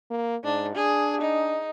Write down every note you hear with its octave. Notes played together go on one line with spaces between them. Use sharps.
A#3
G#2 D4
D4 G#4
D#4